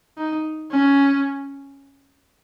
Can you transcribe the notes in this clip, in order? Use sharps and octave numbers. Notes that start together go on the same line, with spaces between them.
D#4
C#4